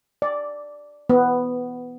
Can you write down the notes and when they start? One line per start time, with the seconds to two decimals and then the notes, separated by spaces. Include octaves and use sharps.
0.22 D5
1.10 B3